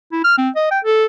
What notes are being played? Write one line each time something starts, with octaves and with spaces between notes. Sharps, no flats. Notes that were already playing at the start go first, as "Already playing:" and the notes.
E4
F6
C4
D#5
G5
A4